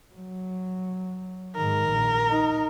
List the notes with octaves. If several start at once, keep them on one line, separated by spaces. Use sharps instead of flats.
F#3
G#2 D#3 A#4
A#1
D#4